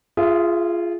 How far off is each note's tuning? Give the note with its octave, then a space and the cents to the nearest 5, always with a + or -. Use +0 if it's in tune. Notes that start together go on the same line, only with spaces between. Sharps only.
F4 -15 G#4 +0 E5 +25